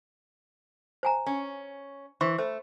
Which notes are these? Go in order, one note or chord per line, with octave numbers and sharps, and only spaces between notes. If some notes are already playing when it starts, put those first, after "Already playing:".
C5 G#5 A#5
C#4
E3 C5 C6 C#6
A3 C5